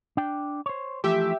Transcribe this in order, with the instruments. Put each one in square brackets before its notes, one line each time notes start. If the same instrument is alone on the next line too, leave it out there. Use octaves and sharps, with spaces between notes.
[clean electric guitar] D4 G5
C5 C#5
[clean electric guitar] E3 F3 A3 [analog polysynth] G4 E5